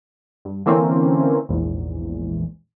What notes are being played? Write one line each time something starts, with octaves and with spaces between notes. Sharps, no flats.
G2
D3 E3 A#3 C4 C#4
A#1 E2 G#2